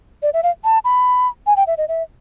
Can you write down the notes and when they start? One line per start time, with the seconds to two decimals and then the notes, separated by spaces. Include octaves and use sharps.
0.23 D5
0.34 E5
0.43 F5
0.64 A5
0.85 B5
1.47 G#5
1.57 G5
1.67 E5
1.78 D#5
1.88 E5